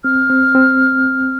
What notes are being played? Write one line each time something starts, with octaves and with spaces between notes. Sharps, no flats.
C4 F6
C4
C4